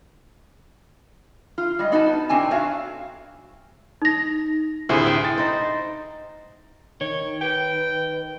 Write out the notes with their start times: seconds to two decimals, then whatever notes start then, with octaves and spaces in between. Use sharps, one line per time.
1.58 F4
1.79 G3 G#3 D#5
1.92 B3 D#4 F#4 B4 A5
2.29 A2 C3 C4 D4 G#5 A5
2.51 F#4 C#5 E5 F5
4.02 D#4 A#6
4.89 D2 A2 C3 E4 G#4 C5
5.06 G5
5.25 A6
5.38 D#4 C5
7.01 D#3 D#4 C#5
7.41 B4 G5